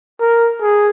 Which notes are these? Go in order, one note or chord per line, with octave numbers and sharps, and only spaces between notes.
A#4
G#4